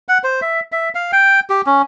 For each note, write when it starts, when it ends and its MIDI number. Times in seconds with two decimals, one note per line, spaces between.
0.09 0.18 78
0.24 0.40 72
0.42 0.60 76
0.72 0.89 76
0.95 1.11 77
1.13 1.40 79
1.50 1.61 67
1.66 1.82 61